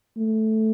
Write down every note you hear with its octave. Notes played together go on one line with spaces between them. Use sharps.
A3